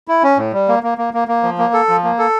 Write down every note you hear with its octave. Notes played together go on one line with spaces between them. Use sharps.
E4
C#4
A2
G3
A#3
A#3
A#3
A#3
A#3
F3
A#3
A4
F3
A#3
A4